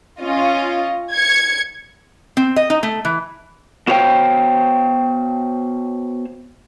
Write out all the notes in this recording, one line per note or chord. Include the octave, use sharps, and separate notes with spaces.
C#4 F4 D#5
G#6 C#7
C4
D#5
D#4
A3
E3
B3 F#4 C5 C#5 F5 G5